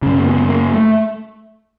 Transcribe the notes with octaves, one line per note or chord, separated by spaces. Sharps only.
F#2 C#3 C#4
A#3
B3
A#3
A3